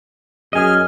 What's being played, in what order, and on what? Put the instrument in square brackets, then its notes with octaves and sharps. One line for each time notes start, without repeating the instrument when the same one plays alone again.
[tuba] F#2 [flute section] G#4 F6 [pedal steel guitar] D#5 G#5